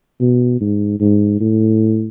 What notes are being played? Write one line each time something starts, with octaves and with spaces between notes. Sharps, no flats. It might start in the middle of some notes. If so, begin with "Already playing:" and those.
B2
G#2
G#2
A2